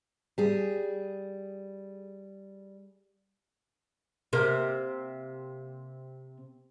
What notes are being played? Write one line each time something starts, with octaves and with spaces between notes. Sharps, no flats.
G3 G#4
C3 A#3